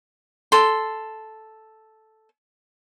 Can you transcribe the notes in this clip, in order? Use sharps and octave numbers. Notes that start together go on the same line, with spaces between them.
A4 C6